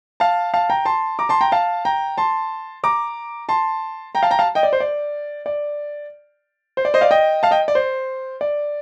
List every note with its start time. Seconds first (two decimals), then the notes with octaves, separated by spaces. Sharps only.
0.20 F5 A5
0.54 F5 A5
0.70 G5 A#5
0.85 A5 C6
1.19 A#5 D6
1.29 A5 C6
1.41 G5 A#5
1.52 F5 A5
1.85 G5 A#5
2.18 A5 C6
2.84 A#5 D6
3.49 A5 C6
4.15 G5 A#5
4.23 F5 A5
4.31 G5 A#5
4.39 F5 A5
4.55 D#5 G5
4.63 D5
4.73 C5
4.80 D5
5.46 D5
6.77 C5
6.85 D5
6.94 C5 D#5
7.01 D5 F5
7.11 D#5 G5
7.43 F5 A5
7.51 D#5 G5
7.68 D5
7.75 C5
8.41 D5